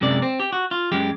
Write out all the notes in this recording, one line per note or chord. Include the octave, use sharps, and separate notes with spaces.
F#2 C3 G#3 D5
C4
G4
F#4
F4
F#2 G#3 G4